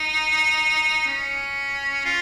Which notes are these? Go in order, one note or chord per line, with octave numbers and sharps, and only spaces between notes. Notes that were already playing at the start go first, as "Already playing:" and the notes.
Already playing: D#4
C#4
F4